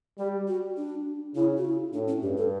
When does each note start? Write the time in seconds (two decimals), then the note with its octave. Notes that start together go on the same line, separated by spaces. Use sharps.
0.19 G3 G4
0.48 F#4
0.77 D4
1.35 C#3 E4
1.57 F#4
1.65 E4
1.93 A2 D4
2.08 C#4
2.22 G2 G4
2.38 A4